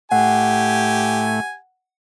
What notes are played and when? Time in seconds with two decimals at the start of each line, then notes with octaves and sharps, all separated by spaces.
0.12 A2 A3 G4 F#5 G#5